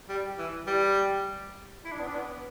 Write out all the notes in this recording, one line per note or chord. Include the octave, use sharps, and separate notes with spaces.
G3
E3
G3
E4
D4
B3
D4
B3